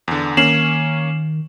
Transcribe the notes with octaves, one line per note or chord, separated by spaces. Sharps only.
E2 D3
D#3 A#3 C#4 C7 E7 F#7